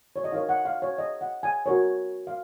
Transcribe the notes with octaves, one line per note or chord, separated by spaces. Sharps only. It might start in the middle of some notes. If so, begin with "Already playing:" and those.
C#5
D#5
D#4 A#4 C#5 F5
F#5
F5
C#5
D#5
F#5
G#5
F#4 A#4 C#5
F5